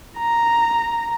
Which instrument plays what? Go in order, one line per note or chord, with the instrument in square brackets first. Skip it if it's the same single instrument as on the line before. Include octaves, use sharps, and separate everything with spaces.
[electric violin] A#5